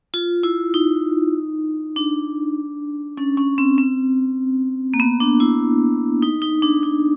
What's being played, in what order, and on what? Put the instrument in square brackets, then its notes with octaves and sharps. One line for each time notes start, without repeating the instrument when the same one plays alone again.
[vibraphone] F4
E4
D#4
D4
C#4
C#4
C4
C4
A#3
B3
D4
E4
D#4
D#4
D4
D#4